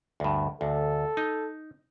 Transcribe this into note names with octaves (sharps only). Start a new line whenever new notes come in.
D2 G2
D2 A4
D#4